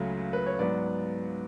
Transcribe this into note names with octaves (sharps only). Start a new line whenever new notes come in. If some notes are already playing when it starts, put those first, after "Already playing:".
Already playing: C#2 C#3 F#3 A3
B4
C#5
G#2 F#3 B3 D5